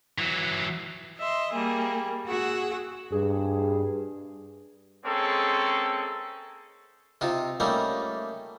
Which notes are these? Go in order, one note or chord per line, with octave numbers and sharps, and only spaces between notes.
E3 F#3
D#5 E5 C6
G3 A#3 G#4
F#4 G#4 F#5 E6
G2 G#4
G#3 A#3 C4 C#4 G#4 A4
C3 D#4 F4
G3 A3 A#3 C#4 D#4